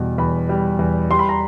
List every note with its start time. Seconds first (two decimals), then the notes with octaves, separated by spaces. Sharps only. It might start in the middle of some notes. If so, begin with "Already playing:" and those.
Already playing: E2 B2 G3
0.18 E2 B5
0.49 G3
0.79 E2
1.10 G3 C6
1.19 B5
1.29 A#5